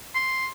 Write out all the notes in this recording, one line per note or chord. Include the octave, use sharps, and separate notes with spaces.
C6